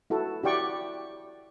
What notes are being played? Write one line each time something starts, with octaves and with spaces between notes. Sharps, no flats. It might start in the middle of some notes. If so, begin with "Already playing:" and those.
E4 F#4 A4
E4 F#4 G4 D5 G5 C#6